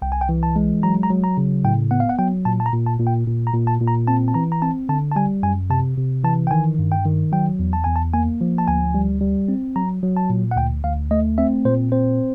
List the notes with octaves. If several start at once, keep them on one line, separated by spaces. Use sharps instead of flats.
C2 G5
G#5
G5
E3
A5
G#3
F#3 A#5
A#5
F#3
A#5
C#3
A2 G5
B3 F#5
F5
F#5
F#3 G5
A#2 A5
A5
A#5
A#2
A5
A#2
G5
A#2
A#5
A#2
A5
A#2
A#5
C4 A5
A5
E3 A#5
A#5
C4 A5
D3 A5
A5
G3 G#5
F#2 G#5
C3 A5
C3
E3 A5
G5
D#3 G#5
G2
G5
D#3
F#3 G5
E2
A5
E2 G#5
A5
A#3 G#5
F3
A5
D2 G#5
G3
G3
C4
F#3 A#5
F#3
A5
A#2
F#5
D2 G5
D2 F5
A3 D#5
C4 E5
A#2 C5
C4 C5